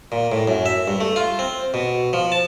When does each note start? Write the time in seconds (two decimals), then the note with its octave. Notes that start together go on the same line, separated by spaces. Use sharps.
0.12 A#2
0.32 A2
0.48 F#2
0.66 E5
0.88 G2
1.00 A3
1.16 F4
1.39 C4
1.74 B2
2.13 F3
2.32 A5